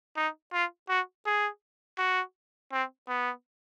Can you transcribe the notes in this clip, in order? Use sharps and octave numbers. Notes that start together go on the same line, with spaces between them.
D#4
F4
F#4
G#4
F#4
C4
B3